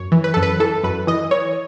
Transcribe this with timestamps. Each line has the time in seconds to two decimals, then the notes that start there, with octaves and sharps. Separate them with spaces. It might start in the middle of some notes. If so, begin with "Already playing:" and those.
Already playing: F#2 C#5
0.12 E3
0.24 B4
0.34 F#2 A4
0.43 B4
0.60 E3 A4
0.84 F#2 B4
1.07 E3 D#5
1.31 E3 C#5